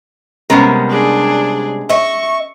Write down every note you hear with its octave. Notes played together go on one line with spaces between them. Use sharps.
C3 G3 G#3 B3 C#4 A#4
D4 G#4
D#5 E5 C#6